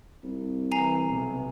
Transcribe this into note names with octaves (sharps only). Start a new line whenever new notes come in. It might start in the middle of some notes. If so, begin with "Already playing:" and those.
C2
E3 G#5 A#5 C7
B1 C3